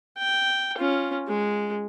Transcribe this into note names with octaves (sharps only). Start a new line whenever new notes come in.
G5
C#4 F4
G#3